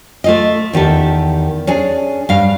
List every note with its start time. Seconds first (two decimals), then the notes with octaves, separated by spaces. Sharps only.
0.24 A3 F4 D#5
0.73 E2 D#3 G4 A4
1.67 C#4 D4 G#4
2.29 G2 F5